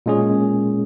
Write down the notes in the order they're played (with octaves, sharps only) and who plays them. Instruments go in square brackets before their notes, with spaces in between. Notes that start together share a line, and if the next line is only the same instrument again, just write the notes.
[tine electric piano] A#2 G#3 C#4 G#4